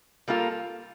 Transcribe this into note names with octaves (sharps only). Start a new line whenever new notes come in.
G3 A#3 F4 A4